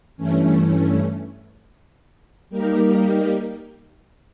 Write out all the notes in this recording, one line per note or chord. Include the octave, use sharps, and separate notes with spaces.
G2 E3 A3 C#4
G3 A#3 D#4 G4 A#4